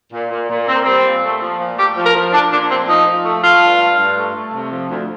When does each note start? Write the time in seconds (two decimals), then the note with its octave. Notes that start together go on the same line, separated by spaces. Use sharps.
0.12 A#2
0.31 A#2
0.49 A#2
0.67 A#2 C4
0.76 A#3
0.83 G3 C4
1.05 A#2
1.22 A3
1.41 F3
1.60 A#2
1.77 A3 G4
1.96 F3
2.05 A#4
2.15 F3
2.32 F3 D4
2.51 A#2 D4
2.69 A3 C4
2.87 F3 D#4
3.06 F3
3.24 A3
3.42 A3 F4
3.61 G2
3.79 A3
3.98 G2
4.16 A3
4.34 A3
4.52 C3
4.70 F3
4.88 D2